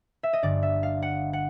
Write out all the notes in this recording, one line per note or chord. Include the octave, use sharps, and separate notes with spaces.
E5
D#5
G1 G2 D3 D5
E5
F5
F#5
F#5